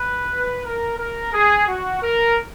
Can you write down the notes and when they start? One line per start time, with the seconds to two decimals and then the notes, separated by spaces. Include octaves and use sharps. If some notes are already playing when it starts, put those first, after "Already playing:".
Already playing: B4
0.65 A#4
0.99 A#4
1.33 G#4
1.67 F#4
2.03 A#4